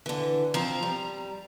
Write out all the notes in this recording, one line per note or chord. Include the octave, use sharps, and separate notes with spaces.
D3 E3
F3 C4 A#5
G3